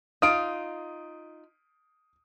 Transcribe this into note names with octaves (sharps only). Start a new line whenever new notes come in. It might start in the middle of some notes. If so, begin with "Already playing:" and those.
D#4 F4 D#6 D7